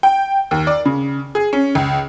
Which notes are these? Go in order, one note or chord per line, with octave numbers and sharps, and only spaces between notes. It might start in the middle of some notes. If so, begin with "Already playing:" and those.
G5
D#2
D5
C#3
G#4
C#4
C#2